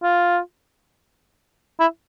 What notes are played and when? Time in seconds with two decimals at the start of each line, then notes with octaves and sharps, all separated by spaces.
0.03 F4
1.80 E4